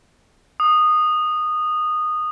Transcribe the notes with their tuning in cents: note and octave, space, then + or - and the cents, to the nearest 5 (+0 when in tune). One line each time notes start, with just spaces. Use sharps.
D#6 -15